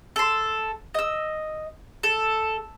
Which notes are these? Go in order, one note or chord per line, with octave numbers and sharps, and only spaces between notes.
A4 C6
D#5 E6
A4